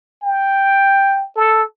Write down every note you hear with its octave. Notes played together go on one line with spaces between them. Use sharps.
G5
A4